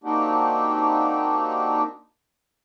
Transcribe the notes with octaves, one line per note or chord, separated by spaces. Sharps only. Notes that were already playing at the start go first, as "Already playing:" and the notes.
A#3 C4 D4 D#4 F#4 G4